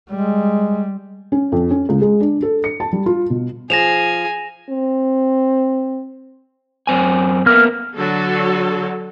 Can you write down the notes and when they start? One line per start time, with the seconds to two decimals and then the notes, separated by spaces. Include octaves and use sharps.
0.10 G3 G#3
1.32 C#4
1.52 F2
1.71 C#4
1.89 C#2
2.02 G#3
2.20 D4
2.42 A4
2.64 C#7
2.80 A5
2.93 G3
3.06 F4
3.30 B2
3.70 F3 G#4 G#5 A#6 E7 F7
4.69 C4
6.87 F#2 C4 G#5
7.46 A#3 B3 A#4 E5 F6
7.96 D3 F#3 F#4 A4